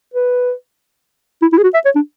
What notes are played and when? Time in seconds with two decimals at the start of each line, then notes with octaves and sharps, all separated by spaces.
0.14 B4
1.42 E4
1.52 E4
1.58 G#4
1.63 F#4
1.74 E5
1.85 C#5
1.95 D4